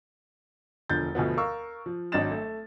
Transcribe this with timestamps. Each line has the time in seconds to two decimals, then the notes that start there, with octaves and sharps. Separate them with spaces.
0.89 E1 D3 F3 G6 A6
1.15 D2 B2 F3 B3
1.37 A#4 F5 C#6 E6
1.86 F3
2.12 G#1 F#3 D4 D#5 A6 E7
2.31 A3